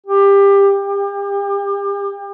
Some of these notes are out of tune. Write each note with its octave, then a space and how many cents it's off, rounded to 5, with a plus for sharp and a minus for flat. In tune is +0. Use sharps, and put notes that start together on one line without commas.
G4 +20
G4 +35